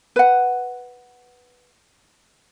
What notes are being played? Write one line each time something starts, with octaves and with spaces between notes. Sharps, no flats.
B4 F#5